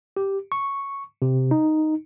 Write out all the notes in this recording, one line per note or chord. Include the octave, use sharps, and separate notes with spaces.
G4
C#6
C3
D#4